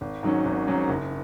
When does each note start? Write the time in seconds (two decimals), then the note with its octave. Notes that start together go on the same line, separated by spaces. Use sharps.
0.01 G#1
0.23 G#2 D#3 F#3 C#4
0.45 G#1
0.67 G#2 D#3 F#3 C#4
0.89 F#1